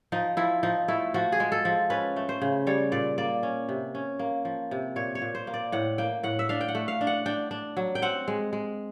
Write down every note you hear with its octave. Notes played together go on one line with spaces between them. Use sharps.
F3 D#4
F3 E4
F3 D#4
A3 E4
F3 F#4
G#4
G#3
A4
F3
C#4 B4
A3
C5
C#3
G3 C#5
A#2 D5
A#3 D5
C#4
C3
C#4
A#3
F3
C3
A#2 C#5
C#5
A#2
C5
A#3
D5
A2 F#5
A#3 G5
A2 F#5
E5
D4 F5
G5
F#5
A3
F5
D4
F#5
D4 G5
D4
F#3
G5
C4 F#5
G#3
G#3